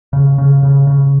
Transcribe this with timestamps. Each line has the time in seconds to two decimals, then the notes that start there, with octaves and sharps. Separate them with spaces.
0.13 C#3
0.38 C#3
0.63 C#3
0.87 C#3